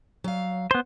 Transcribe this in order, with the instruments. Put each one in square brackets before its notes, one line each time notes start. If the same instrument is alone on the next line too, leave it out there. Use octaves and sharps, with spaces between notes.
[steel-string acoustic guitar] F#3 F5
[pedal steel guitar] B3 C5